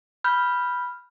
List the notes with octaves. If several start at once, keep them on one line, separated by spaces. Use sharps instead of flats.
B5 F6 G6